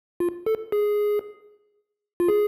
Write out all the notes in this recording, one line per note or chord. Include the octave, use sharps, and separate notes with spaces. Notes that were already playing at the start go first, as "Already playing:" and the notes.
F4
A4
G#4
F4
G#4